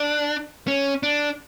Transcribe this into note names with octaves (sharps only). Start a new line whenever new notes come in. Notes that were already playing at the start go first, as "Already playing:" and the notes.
Already playing: D4
C#4
D4